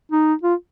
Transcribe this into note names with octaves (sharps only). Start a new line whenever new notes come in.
D#4
F4